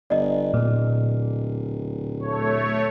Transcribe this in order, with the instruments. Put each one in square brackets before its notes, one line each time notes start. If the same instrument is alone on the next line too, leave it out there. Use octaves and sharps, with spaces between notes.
[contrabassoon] G1 [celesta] D5 D#5
[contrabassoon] D1 [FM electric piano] A#2
[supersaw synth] A3 C#5